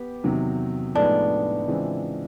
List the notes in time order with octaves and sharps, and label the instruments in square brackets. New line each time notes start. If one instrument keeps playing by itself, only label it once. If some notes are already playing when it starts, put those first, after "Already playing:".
Already playing: [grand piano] B3 G4
E2 C3 D#3 F#3
[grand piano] A2 F3 G#3 B3 D#4 [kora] D4
[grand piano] C#3 E3 G#3 C4 F4